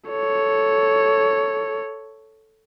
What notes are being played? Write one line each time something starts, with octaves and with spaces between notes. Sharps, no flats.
A4 C#5